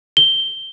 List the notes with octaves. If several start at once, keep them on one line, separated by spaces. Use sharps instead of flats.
G7